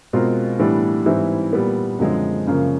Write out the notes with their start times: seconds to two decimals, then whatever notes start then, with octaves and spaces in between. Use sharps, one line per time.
0.13 B2 G#3 C4 F4 A#4
0.59 A2 E3 G3 B3 D4
1.06 G#2 E3 G3 C4 E4
1.53 A#2 G3 B3
1.99 F#2 D3 F3 G#3 C4
2.47 F#2 C#3 F3 A#3 C#4